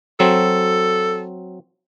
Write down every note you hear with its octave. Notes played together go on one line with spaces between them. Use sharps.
F#3 C4 A4